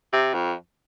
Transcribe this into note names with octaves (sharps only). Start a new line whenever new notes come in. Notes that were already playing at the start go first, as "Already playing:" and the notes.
C3
F2